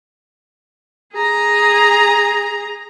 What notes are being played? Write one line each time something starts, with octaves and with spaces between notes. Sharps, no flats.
G#4 A#5